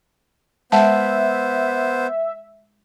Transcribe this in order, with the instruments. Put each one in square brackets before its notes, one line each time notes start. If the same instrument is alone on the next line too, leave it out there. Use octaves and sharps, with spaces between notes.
[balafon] G#3 F#5 A5 [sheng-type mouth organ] B3 C5 [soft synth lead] E5